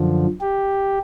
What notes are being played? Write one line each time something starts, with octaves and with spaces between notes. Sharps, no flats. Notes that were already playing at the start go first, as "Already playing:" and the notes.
Already playing: F#2 D3 F3
G4